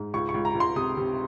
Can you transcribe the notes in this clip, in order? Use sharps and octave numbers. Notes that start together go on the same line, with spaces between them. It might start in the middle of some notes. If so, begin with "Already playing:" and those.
Already playing: G#2
C#2 C#6
C#6
C#2
A#5
C#2
C6
C3 D#6
C3